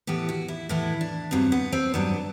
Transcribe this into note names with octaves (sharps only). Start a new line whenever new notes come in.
A2 E3 B3 G4
F#4
E4
A2 E3 B3 E4
D4
G2 F#3 B3 C4
B3
C4
G2 F#3 B3 D4